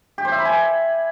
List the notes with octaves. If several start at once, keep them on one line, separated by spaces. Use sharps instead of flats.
G4
C5
E5
B5
G#5